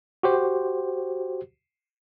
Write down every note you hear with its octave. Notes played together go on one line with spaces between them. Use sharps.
F#4 G4 C5